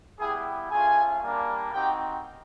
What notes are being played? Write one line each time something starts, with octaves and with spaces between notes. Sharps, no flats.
G3 B3 E4 G4 G#4 G#5
A3 C#4 F4 G#4 G#5
G3 A#3 D4
C4 D#4 F#4 G4 G5